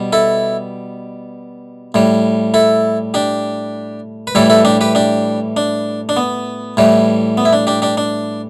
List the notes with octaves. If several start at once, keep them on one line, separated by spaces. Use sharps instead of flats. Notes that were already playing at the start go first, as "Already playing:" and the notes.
Already playing: B2 G3
E4 A4
A2 G3
E4 A4
D4 G4
B4
A2 E3 G3 E4 A4
E4 A4
D4 G4
G4 B4
D4 G4
D4
D4
B3
A2 E3 G3
B3
E4
D4
D4 G4
D4 G4
D4